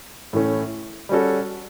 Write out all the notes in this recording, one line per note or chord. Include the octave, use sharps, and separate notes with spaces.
A2 E3 A3 C#4
G3 C#4 F#4 A4